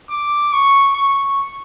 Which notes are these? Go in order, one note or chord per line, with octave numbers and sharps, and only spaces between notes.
D6
C#6
C#6